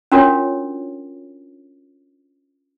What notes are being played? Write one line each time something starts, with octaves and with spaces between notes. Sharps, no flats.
C#4 D4 F4 F#4 A#4 C#5